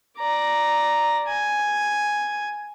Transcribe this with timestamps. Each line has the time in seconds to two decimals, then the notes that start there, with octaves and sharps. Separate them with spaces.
0.18 D5 A#5
1.29 G#5